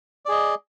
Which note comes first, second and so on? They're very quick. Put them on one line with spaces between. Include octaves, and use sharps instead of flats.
D5 G#4 D#5